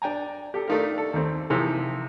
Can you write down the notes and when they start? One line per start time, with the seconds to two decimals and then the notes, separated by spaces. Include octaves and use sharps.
0.02 D4 G5 G#5 A#5
0.54 G4 A4
0.68 A3 D4 D#4 F4 A#4
0.93 D4 A4
1.14 D#2 A3 C4
1.50 C3 E3 F3 A#3 D#4 G#4